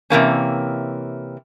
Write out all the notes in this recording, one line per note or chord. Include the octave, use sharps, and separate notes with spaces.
C3 E3 A#3 C#4